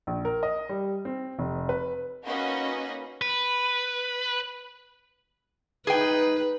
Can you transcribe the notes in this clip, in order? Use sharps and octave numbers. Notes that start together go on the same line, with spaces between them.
A#1
A#4
D#5
G3
C4
F1
B4
A#3 C#4 D#4 F#4 B4 D#5
B4
D#4 G#4 B4 G5